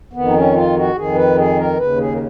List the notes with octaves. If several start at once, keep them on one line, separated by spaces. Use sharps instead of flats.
F2 D#3 B3
D#4
C#4
F4
F#4
F2 D#3 G#4
B4
G#4
A#4
D#2 C#3 B4
G#4
A#4